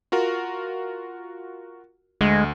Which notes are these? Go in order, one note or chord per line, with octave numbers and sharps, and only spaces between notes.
F4 F#4 A#4
D2 G#3